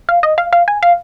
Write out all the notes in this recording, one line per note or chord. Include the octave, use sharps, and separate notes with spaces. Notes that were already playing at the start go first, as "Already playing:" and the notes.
F5
D#5
F5
F5
G#5
F5